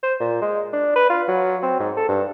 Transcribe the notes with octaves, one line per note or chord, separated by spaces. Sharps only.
C5
A#2
G#3
D4
B4
F4
F#3
C4
G#2
A4
G2